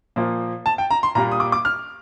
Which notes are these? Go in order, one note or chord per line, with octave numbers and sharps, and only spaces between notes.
A#2 F3 A#3
A5
G5
A#5
C6
A#2 G3 A#3 A#5
D#6
D6
D6
F6